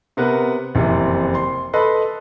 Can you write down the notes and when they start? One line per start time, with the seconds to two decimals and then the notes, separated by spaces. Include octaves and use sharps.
0.17 C3 B3 A#4 B4
0.75 F#1 F2 C3 E3
1.35 C6
1.73 A4 B4 D#5 B5 C6